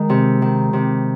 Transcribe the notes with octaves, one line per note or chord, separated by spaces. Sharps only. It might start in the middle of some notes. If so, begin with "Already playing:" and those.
Already playing: D#3 G#3
C3
D#3
C3